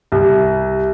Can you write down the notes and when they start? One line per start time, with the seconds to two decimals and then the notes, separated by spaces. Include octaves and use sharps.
0.12 C2